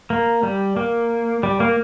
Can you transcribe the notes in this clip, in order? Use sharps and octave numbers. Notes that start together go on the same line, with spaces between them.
A#3
G3
A#3
G3
A#3